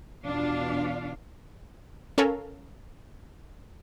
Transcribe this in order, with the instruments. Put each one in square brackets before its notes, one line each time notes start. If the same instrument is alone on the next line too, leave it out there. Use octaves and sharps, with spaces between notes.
[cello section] E2 B2 D4 F4 F5
[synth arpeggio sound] C#4 A4 A#4 F5